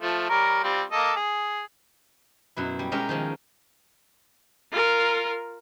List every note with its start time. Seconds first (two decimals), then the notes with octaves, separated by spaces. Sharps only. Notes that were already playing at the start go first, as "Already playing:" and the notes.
0.02 F3 A3
0.29 G3 A#4 C#5
0.63 G3 C4 F4
0.92 A#3 A4 D#5
1.16 G#4
2.57 F#2 B2 E4
2.79 G3
2.91 B2 G#3 C#4 G4 A#4 E5
3.09 D#3 F3 G#3
4.71 F4 A#4